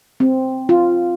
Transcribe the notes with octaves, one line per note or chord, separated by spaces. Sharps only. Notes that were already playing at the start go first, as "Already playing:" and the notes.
C4
F4